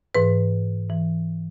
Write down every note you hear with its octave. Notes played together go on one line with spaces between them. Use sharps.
G#2 E3 B4
G#2 E3